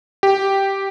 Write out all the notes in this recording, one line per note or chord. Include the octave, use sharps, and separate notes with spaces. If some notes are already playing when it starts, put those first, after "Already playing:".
G4